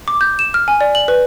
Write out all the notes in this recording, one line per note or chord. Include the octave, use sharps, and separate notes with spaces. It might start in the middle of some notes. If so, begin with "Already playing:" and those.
D6
G6
E7
F6
G#5
D5
F#7
B4